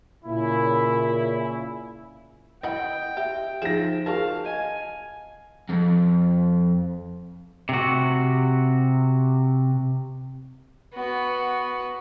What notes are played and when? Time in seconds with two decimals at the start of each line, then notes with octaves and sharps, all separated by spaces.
0.25 A#2 C#3 E4
2.63 E4 D#5 F#5 G5 B5
3.17 G4 E5
3.62 F3 D#4 G#4 A#6 E7
4.06 F#4 G#4 A#4 F5 A5
4.46 D#5 G#5 D#7
5.69 F2
7.69 C3 F#4
10.94 B3 F#4